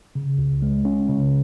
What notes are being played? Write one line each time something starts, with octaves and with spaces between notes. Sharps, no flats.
C#3
C#2
G#3
C#4
C#3